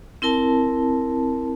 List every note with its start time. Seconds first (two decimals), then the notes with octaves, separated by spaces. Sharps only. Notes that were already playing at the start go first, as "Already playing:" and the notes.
0.22 C4 E4 A#4 A5